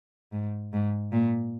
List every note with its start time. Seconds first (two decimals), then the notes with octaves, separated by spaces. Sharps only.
0.32 G#2
0.73 G#2
1.13 A#2